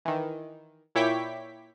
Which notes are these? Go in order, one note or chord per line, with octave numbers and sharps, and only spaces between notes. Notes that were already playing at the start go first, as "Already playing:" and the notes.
D#3 E3
A#2 E4 C#5 G5 D6 B6